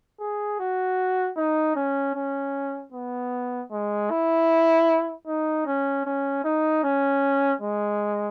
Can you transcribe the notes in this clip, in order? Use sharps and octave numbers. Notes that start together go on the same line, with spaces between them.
G#4
F#4
D#4
C#4
C#4
B3
G#3
E4
D#4
C#4
C#4
D#4
C#4
G#3